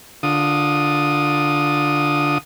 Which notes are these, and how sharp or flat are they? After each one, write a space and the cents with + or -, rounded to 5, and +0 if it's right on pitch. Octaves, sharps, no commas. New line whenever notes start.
D3 +0 F4 +15 D#6 -5